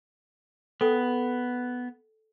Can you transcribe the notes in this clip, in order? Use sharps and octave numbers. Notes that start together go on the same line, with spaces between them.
B3 A4 G5 D#6